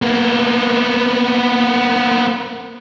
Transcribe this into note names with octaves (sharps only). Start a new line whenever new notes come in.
A#3 B3